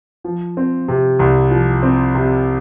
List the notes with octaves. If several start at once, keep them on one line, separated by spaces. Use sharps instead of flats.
F3
C4
C3
C2
F3
C4
C3